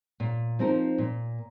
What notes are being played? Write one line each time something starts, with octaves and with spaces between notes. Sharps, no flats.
A#2
F3 C4 D#4 A#4
A#2